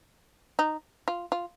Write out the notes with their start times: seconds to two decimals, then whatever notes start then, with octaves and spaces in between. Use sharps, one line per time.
0.59 D#4
1.08 F4
1.32 F4